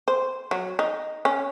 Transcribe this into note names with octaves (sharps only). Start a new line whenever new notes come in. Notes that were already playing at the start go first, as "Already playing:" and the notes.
C5
F#3
D#4
C#4